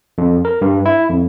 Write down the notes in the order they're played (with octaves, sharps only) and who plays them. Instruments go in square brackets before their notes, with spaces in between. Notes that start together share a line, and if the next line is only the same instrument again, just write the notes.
[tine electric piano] F2
A#4
G2
E4
F2